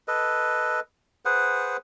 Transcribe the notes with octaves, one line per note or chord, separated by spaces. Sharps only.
A4 B4 D#5
G#4 B4 C5 F#5